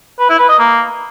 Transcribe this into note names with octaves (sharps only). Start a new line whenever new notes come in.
B4
E4
B4
D#5
A#3